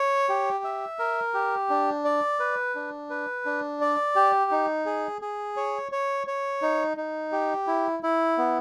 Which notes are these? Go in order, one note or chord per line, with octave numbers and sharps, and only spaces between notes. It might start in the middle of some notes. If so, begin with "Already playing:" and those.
Already playing: C#5
G4
E5
A#4
G4
D4
D5
B4
D4
B4
D4
D5
G4
D#4
G#4
G#4
C#5
C#5
C#5
D#4
D#4
G4
E4
E4
B3